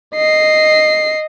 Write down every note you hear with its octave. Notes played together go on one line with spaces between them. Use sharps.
D#5 C7